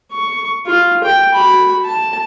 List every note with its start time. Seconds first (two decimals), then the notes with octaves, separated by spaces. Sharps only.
0.12 C#6
0.66 F4
1.04 G5
1.34 F#4 B5
1.85 A5